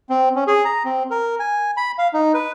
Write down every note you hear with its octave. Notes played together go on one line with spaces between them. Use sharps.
C4
C#4
G#4
A#5
C4
A#4
G#5
B5
F5
D#4
B4